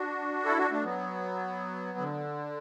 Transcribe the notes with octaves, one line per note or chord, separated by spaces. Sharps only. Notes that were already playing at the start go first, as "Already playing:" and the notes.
Already playing: D4 F#4
E4 A4
D4 F#4
A3 D4
F#3 B3
D3